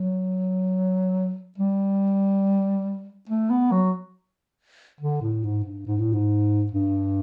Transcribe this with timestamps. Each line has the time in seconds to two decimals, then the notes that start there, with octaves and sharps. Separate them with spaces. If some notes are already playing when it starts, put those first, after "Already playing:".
Already playing: F#3
1.58 G3
3.29 A3
3.50 B3
3.72 F#3
5.01 D3
5.22 A2
5.44 G#2
5.64 G2
5.86 G#2
5.98 A2
6.13 G#2
6.72 G2